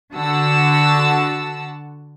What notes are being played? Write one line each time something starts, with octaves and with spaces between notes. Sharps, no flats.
D3 F#4 F#5 A5 E6